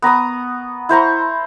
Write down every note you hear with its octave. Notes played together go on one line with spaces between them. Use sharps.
B3 A#5 C#6 D#6
E4 C5 A#5 C#6